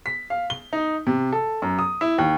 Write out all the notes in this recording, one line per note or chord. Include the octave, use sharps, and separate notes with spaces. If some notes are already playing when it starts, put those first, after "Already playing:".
B6
F5
G7
D#4
C3
A4
F#2
D#6
E4
D#2